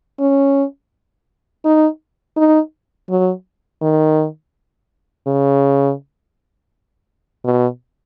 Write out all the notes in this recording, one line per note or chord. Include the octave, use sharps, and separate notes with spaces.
C#4
D#4
D#4
F#3
D#3
C#3
B2